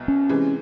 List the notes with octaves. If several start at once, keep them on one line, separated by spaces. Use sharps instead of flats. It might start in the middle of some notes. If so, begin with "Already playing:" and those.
Already playing: C2 B2
C#4
C3 E3 G#3